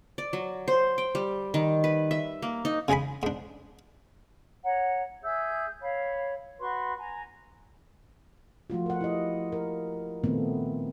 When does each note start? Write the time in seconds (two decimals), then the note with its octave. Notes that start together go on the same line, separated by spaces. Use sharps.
0.18 D5
0.33 F#3
0.68 C5
0.98 G5
1.15 G3
1.54 D#3
1.84 B4
2.11 E5
2.42 A#3
2.65 D#4
2.88 C#3 G#3 G#4 G#5 B5
3.23 G#2 D4
4.64 C#5 F#5 A#5
5.23 G#4 E5 E6 G6
5.81 C#5 F5 B5
6.59 F#4 B4 C6 C#6
6.97 G#5 A#5
8.70 F3 A3 F4 F#4
8.86 A#4 F#5
9.01 E4 G4 D#5
9.52 A#4
10.24 A#2 D#3 A3 B3 C4